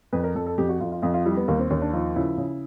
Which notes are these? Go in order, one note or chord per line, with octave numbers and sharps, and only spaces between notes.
F2 B4
A#4
F2 A4
A4
F2 G4
F#4
F2 F4
F4
F2 F4
F4
G3 E4
B3
D#2 A#3
C4
D#2 C#4
D4
F3 D#4
C#3 E4
C#3